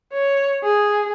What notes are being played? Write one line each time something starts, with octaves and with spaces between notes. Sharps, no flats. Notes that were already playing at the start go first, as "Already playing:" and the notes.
C#5
G#4